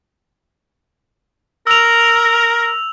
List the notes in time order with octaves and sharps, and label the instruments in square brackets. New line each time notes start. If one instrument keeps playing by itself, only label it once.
[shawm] A#4 [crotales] E6 F7